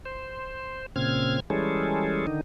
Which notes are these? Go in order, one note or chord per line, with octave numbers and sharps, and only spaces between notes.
C5
A#2 C#3 C4 F6 G#6
E3 G3 G#3 C#4 G#4 A4
D3 D#3 D#4